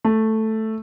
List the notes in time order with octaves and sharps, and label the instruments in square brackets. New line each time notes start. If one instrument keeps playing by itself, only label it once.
[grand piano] A3